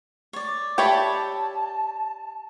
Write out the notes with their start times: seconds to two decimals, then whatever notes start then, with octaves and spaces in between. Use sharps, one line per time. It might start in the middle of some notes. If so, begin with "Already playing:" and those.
0.33 C#5 D5
0.78 G4 C#5 D5 E5 A5 B5 C#6